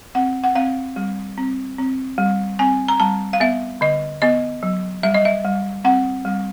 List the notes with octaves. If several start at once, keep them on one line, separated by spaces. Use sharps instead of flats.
C4 F#5
F#5
C4 F5
G3
C4
C4
G3
C4 G#5
A#5
G3 A5
F5
B3 E5
D3 D#5
B3 D#5
F#3
G3 E5
D#5
E5
G3
C4 F#5
G3